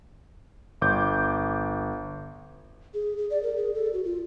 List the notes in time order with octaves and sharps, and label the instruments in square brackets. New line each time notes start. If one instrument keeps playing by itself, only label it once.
[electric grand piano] G1 D6 G6
[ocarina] G#4
G#4
D5
A#4
G#4
A4
F#4
F4